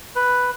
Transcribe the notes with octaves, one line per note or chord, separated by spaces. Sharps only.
B4